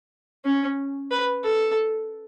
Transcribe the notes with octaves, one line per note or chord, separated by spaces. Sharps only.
C#4
B4
A4